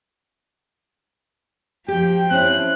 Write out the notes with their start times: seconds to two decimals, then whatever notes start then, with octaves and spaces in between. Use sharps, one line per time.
1.88 F3 G4 G5
2.31 C4 C#4 E4 F#6